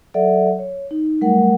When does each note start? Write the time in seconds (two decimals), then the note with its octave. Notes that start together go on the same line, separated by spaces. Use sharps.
0.14 F#3 A4 D5 E5 F#5
0.59 C#5
0.91 D#4
1.21 F#3 G3 A3 A#4 F#5